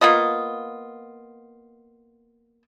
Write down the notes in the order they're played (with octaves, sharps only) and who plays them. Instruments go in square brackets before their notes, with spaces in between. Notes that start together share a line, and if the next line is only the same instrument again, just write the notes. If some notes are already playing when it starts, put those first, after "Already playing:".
[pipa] A#3 B3 F4 D#5